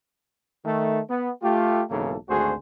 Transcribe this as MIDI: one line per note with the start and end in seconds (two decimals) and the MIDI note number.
0.65 0.99 51
0.65 0.99 57
1.09 1.30 59
1.42 1.81 57
1.42 1.81 65
1.42 1.81 67
1.90 2.15 35
1.90 2.15 44
1.90 2.15 49
1.90 2.15 52
1.90 2.15 58
1.90 2.15 69
2.29 2.54 32
2.29 2.54 38
2.29 2.54 57
2.29 2.54 66
2.29 2.54 68
2.29 2.54 72